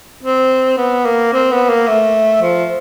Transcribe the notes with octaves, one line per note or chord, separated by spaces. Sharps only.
C4
B3
A#3
C4
B3
A#3
A3
F3